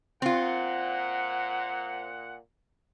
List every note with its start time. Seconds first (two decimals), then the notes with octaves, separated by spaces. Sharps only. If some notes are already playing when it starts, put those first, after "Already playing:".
0.22 A#2 C4 F4 F#5